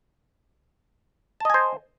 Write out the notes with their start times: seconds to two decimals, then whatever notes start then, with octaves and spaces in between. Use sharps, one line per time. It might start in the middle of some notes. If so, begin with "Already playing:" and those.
1.40 A5
1.45 D#5
1.50 G#5
1.54 C5